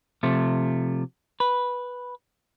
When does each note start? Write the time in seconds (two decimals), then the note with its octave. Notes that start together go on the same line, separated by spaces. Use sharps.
0.23 C3 F3 A3
1.40 B4